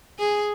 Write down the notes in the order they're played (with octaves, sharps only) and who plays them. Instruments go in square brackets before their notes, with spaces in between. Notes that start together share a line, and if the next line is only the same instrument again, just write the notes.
[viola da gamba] G#4